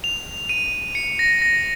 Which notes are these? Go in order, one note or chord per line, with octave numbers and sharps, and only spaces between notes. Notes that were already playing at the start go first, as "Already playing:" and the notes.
F7
D#7
C#7
A#6
A#6